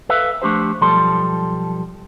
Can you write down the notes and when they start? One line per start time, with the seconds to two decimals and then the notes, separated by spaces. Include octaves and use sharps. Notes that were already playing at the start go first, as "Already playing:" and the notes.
0.09 A4 B4 E5 F5
0.42 F3 A3 D4 G4 C5
0.81 B1 F3 G3 A4 C6